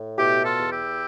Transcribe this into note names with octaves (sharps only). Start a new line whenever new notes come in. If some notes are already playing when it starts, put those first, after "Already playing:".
Already playing: A2
B2 E4 G4
F4 A4
E2
E4 G4